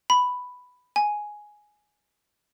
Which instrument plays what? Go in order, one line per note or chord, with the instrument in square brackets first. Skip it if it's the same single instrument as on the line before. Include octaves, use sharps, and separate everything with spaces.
[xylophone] B5
G#5